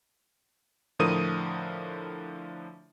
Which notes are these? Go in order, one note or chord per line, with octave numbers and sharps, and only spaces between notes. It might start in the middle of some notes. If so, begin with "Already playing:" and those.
A2 D3 F3 A#4 D#6 D#7